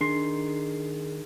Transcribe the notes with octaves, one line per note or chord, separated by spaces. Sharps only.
D#3 D4 G#4 C6